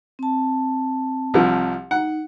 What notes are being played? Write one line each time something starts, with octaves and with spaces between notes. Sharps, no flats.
C4 A5
C2 F3
D#4 F#5